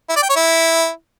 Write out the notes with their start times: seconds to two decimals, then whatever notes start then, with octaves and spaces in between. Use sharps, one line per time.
0.10 E4
0.16 D5
0.23 G5
0.30 C#5
0.37 E4